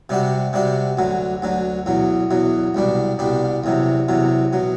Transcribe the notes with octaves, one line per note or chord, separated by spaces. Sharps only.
C3 G3 D4 F#4
C3 G3 D4 F#4
D2 D3 F#3
D2 D3 F#3
E2 B2 F#3
E2 B2 F#3
C2 B2 G3 D4
C2 B2 G3 D4
E2 C3 F#3
E2 C3 F#3
B2 F#3